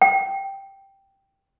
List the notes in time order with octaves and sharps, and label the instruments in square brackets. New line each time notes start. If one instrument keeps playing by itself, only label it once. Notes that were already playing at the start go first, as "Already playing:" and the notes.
[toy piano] G5